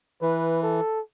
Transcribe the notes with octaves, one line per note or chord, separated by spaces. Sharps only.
E3 B4
A4